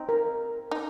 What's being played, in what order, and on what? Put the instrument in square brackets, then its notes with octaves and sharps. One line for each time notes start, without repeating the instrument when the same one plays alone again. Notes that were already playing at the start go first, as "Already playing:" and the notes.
Already playing: [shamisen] C4 D#4
[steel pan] A#4
[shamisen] D#4